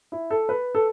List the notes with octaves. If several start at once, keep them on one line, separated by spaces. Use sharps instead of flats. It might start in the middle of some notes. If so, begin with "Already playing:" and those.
E4
A4
B4
A4